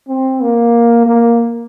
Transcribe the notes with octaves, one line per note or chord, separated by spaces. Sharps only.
C4
A#3
A#3